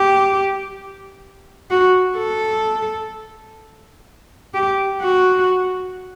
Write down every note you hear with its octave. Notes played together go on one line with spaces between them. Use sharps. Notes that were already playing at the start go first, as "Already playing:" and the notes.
Already playing: G4
F#4
A4
G4
F#4